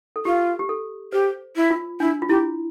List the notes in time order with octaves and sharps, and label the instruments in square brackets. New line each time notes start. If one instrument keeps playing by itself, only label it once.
[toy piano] A4
[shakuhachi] F4 [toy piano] G4
[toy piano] G4
A4
[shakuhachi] G4 [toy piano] C5
[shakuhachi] E4
[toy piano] F4
[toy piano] D4 [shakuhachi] E4
[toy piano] F4
[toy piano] E4 [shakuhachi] G4